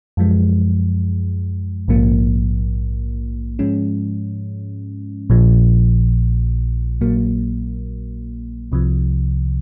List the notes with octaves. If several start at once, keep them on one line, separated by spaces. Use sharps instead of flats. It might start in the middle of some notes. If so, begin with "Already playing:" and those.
F#2 F3 G#3
A#1 G#2 F3 A#3
G#2 F3 G#3 C#4
A#1 A#2 F3
A#1 A#2 F#3 A#3
C2 C3 F3